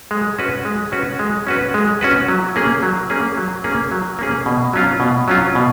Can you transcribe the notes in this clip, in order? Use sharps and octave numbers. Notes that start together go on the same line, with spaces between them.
G#3
C#4 F#4 B4
G#3
C#4 F#4 B4
G#3
C#4 F#4 B4
G#3
C#4 F#4 B4
F#3
A#3 C#4 G#4
F#3
A#3 C#4 G#4
F#3
A#3 C#4 G#4
F#3
A#3 C#4 G#4
B2
F#3 C#4 F4
B2
F#3 C#4 F4
B2